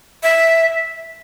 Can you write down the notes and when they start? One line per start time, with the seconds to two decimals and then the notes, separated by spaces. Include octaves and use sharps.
0.23 E5